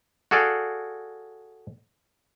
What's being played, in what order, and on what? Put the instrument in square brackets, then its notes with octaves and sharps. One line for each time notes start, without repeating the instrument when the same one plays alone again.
[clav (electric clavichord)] F#4 G#4 A4 D5 F5